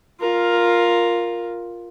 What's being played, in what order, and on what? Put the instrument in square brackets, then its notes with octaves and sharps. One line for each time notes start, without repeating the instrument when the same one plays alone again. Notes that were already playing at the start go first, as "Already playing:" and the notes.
[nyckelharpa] F4 A#4